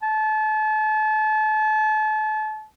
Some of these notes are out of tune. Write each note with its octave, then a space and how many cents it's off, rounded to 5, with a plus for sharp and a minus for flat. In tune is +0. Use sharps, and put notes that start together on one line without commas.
A5 -35